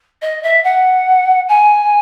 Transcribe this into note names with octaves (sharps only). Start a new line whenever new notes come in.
D#5
E5
F#5
G#5